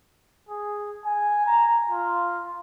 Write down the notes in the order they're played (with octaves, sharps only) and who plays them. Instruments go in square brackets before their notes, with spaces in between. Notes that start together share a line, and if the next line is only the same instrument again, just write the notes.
[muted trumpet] G#4
G#5
A#5
F4